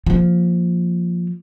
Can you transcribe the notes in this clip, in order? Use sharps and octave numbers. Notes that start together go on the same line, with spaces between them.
F3 A#3